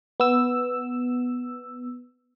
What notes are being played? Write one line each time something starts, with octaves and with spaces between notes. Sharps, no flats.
B3 E6